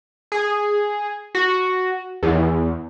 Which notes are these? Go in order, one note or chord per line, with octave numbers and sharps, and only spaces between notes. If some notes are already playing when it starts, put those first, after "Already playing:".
G#4
F#4
E2